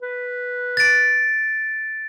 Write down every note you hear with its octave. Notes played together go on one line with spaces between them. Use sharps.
B4
A6 D7